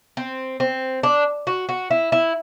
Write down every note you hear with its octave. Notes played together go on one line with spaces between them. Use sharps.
C4
C4
D4
F#4
F#4
E4
E4